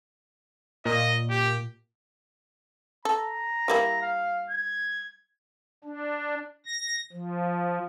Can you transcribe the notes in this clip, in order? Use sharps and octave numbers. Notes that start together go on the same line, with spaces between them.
A#2 D#5
G4
A4 A#5
G3 A#3 E4
F5
G#6
D4
A#6
F3